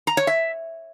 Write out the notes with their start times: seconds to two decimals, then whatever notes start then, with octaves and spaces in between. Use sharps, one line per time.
0.07 A#5
0.17 C#5
0.27 E5